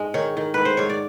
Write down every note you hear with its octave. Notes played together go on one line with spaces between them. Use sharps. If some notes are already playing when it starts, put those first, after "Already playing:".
Already playing: G#2 G#3
D#3 C#5
D#3
G#2 B4
C5
G#2 C#5
D5